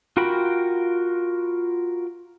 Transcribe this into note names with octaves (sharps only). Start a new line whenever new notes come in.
F4 F#4 A#4 G5 B5